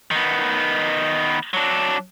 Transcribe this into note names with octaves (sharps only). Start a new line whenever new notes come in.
D#3 B3
F#3 D4